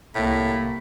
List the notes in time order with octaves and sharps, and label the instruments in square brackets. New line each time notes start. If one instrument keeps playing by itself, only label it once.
[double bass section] C2 [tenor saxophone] A2 [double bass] A#3 [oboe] B5